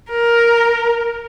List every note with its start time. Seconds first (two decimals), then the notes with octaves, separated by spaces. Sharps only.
0.11 A#4